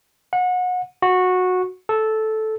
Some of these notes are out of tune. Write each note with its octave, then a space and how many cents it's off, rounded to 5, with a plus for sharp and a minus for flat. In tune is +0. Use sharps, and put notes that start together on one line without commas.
F#5 -30
F#4 -15
A4 -10